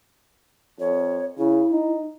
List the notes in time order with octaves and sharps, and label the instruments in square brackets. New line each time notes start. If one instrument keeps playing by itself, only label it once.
[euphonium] F2 [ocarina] C#5
[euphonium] C#3 [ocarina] E4
[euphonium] D#4